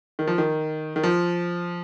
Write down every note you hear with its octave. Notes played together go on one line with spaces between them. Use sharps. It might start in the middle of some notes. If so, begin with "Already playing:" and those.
D#3
F3
D#3
D#3
F3